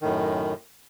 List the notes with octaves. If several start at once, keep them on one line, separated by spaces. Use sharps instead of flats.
F#2 A2 D#3